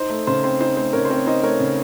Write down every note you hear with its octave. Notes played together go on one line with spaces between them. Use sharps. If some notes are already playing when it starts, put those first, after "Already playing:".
Already playing: D#4 C5
A3
C#3 C5
C4 C5
D#4 C5
A3 C5
C#3 A#4 C#5
C5
C4 A#4 C#5
D#4 C5 D#5
A3 A#4 C#5
C#3